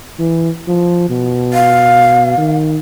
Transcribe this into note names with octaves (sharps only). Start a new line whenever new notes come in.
E3
F3
B2
F5
D#3